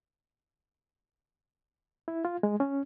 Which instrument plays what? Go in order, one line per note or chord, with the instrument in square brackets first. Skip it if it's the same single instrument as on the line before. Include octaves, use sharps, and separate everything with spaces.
[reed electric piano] E4
F4
G#3
C#4